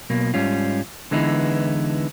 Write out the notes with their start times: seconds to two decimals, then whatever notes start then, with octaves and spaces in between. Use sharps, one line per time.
0.10 B1 B2 A#3
0.34 G#2 G3 C#4 F4
1.11 D3 E3 G#3 B3 D#4 E4